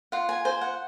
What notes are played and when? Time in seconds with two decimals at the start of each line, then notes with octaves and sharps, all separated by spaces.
0.12 F4 F#5
0.29 G#5
0.45 C5 G#5
0.61 F#5